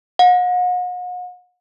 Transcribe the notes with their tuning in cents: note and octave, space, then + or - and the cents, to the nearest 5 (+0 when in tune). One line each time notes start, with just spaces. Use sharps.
F#5 -40